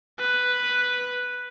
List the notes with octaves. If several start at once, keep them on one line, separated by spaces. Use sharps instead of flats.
B4